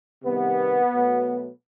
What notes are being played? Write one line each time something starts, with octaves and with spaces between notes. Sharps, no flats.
C3 D#3 G3 B3
B2 F#3 A3